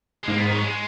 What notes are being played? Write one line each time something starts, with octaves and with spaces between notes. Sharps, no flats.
G#3
G#2 A#3
B3
D#3
F#3
G#3